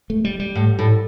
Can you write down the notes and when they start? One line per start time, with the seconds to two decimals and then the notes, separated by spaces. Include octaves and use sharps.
0.10 A3
0.25 G3
0.40 G3
0.55 A2
0.79 A2